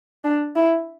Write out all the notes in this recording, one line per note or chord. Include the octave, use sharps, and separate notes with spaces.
D4
E4